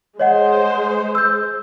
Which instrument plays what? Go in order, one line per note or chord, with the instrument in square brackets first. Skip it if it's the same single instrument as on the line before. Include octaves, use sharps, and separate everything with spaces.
[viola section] G#3 C5 [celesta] C#5 D#5 F#5
[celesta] E6 G6